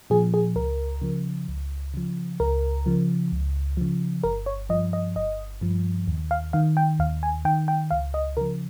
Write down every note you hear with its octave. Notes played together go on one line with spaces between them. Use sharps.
A#2 F3 G#4
G#4
C#2 A#4
C#3 F3
C#2
C#3 F3
C#2 A#4
C#3 F3
C#2
C#3 F3
G1 A#4
C#5
G2 F3 D#5
D#5
G1 D#5
G2 F3
D#2
F5
D#3 F5
G5
D#2 F5
G#5
D#3 G5
G5
C#2 F5
D#5
C#3 F3 A#4